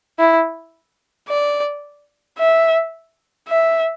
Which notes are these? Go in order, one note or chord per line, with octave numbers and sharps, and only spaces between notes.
E4
D5
E5
E5